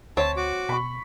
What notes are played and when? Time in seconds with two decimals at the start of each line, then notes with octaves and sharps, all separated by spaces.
0.17 D2 C4 C#5 E5 A5
0.36 F#4 D6
0.69 B2 B5 C#6